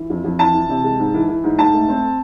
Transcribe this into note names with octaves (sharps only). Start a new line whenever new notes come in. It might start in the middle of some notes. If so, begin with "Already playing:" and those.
Already playing: E3
F2
F2
E3 A5
E3
C3
G#3
G#2
E3
E3
G#2
G#2 A5
A3
C4